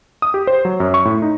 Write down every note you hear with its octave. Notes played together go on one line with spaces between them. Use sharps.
D#6
G4
C5
F#3
F#2
C#6
A2
D#4